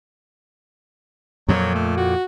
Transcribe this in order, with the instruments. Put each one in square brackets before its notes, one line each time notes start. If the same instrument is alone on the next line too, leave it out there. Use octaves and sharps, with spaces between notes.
[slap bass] F2 A#2 [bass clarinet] F#3
[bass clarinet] A3
F#4